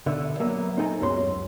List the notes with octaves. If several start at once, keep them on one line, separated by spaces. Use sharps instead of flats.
B2 D3 B3 E5
F#3 A#3 B3 E5
C4 D#4 A4 G5 G#5 A#5
C#2 F#2 C#3 B3 F#4 C6